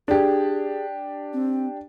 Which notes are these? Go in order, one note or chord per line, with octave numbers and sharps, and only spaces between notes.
D4 G4 G#4
C4